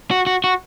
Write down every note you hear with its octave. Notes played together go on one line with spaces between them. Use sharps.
F#4
F#4
F#4